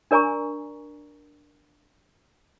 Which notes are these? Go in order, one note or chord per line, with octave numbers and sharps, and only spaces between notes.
D4 A#4 D5 G#5 A#5 C#6